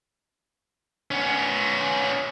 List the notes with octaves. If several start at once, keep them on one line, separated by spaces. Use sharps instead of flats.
B3 C#4